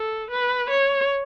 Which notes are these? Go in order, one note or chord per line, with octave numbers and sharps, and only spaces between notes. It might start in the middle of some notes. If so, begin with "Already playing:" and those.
Already playing: A4
B4
C#5